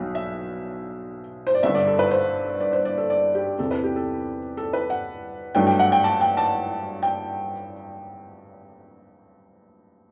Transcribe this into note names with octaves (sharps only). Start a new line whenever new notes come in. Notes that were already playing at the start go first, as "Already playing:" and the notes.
Already playing: B1 B2 F#3
E5
C5
D5
G1 G2 D3 E5
D5
A4
B4
C5
D5
C5
D5
A4
D5
G4
E2 C3 E3 A4
B4
G4
A4
A4
B4
F#5
G2 F#3 A3 D4 G5
G5
F#5
G5
A5
G5
A5
G5